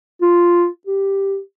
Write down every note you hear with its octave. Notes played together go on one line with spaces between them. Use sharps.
F4
G4